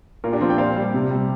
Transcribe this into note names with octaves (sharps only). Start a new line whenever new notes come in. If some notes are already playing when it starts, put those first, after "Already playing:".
A#2 F4 A#4
D4 G4
F3 C4 F4
D5 G5
A#2 C5 F5
G3
C3
G3